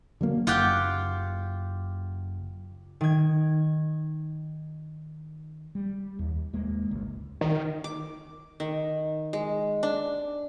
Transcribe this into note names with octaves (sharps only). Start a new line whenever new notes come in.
D3 F#3 A#3
F#1 F4 G4 F#5
D#3 G#6
G3
D#2
D#2 G#3 A#3
D1 G1 C#2
D#3
D6
D#3
G#3
D4